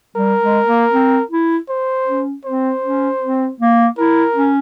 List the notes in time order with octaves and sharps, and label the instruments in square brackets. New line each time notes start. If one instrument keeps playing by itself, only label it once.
[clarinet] G3 [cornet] A#4
[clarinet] G#3
A#3
C4
E4
[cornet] C5
[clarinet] C#4
[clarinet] C4 [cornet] C5
[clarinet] C#4
C4
A#3
[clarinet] E4 [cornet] A#4
[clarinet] C#4